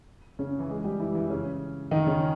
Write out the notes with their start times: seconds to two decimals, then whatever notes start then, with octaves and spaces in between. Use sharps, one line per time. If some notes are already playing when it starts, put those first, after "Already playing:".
0.39 C#3 C#4
0.59 E3 E4
0.69 G#3 G#4
0.84 G3 G4
1.00 E3 E4
1.15 E3 E4
1.30 C#3 C#4
1.91 D#3 D#4
2.07 C#3 C#4